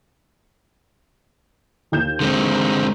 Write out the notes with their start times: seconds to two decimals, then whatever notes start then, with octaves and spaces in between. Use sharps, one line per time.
1.92 D#2 G6 E7
2.20 D3 G#3 C4